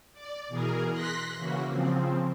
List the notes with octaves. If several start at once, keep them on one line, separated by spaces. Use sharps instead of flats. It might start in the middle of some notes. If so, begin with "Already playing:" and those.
D5
B2 E3 G#4 A#4
C6 F#6 A#6 B6
C#3 E3 A#3 F#4
C#3 F3 C4